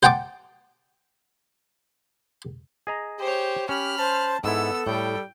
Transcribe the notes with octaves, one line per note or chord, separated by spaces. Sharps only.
C5 F#5 G5 A5 D6
G#4 D#5 A#5
G4 C5 C#5
C#4 G4 B5 F6
C5 A5
G#2 B3 E4 A4 E6
A2 G3 G5